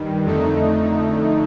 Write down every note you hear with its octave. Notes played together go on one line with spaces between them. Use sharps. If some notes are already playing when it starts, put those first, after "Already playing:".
Already playing: G2 D#3 G3
F2 D3 A3 D#4